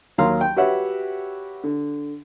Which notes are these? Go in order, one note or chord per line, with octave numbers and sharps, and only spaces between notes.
D#2 D#3 F#3 F5 A#5 C6
G5
F#4 G4 B4 C#5 E5 F#5
D3